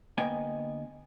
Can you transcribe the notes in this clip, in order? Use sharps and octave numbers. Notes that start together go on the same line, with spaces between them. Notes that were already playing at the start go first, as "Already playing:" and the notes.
D2 A#3 B3 D#5 G5 G#5